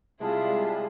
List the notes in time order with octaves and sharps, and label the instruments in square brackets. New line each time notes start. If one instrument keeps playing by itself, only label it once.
[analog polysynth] C3 G3 G#3 [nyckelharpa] E4 G#4 [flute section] F4 E5 A5